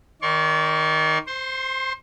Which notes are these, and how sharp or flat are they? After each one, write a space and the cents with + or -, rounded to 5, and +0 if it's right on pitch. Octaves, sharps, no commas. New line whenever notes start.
D#3 +10 D5 -40 C6 +45
C5 +0 C6 +30